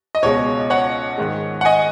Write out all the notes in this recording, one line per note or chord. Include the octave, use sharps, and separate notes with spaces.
D#5
C#2 B2 G#3 C#5
C#5 F#5
G#2 D#3 G#3
F#5
D#5 G#5